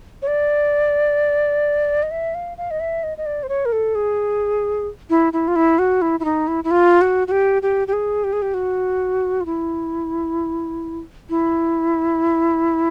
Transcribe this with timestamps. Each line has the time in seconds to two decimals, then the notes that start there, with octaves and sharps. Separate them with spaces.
0.22 C#5
0.27 D5
2.03 D#5
2.11 E5
2.35 F5
2.58 F5
2.71 D#5
2.80 E5
3.03 D#5
3.18 D#5
3.26 D5
3.43 C5
3.49 C#5
3.65 A#4
3.72 A4
3.95 G#4
5.10 E4
5.33 E4
5.48 F4
5.56 E4
5.79 F#4
6.02 E4
6.20 E4
6.25 D#4
6.48 E4
6.64 E4
6.71 F4
7.01 F#4
7.28 F#4
7.32 G4
7.62 G4
7.88 G4
7.93 G#4
8.24 G4
8.33 G#4
8.42 G4
8.54 F#4
9.41 F4
9.46 E4
11.30 E4